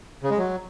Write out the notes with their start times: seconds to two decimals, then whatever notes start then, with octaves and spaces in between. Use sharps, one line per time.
0.23 C#3
0.30 G#3
0.38 F#3